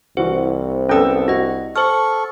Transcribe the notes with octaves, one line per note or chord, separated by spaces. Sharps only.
C2 E3 F#4 C5
B3 C#4 A4 G5 D#6
F#4 D#5 A#6
A4 C5 C#6 F6